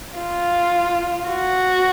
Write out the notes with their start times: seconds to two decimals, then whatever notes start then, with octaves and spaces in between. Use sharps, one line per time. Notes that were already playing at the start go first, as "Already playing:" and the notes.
0.19 F4
1.28 F#4